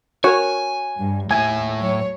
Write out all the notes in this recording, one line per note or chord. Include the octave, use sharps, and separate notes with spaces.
F#4 A#4 C#5 G#5
G2
D#2 A2 E5 G#5
F#3 C#5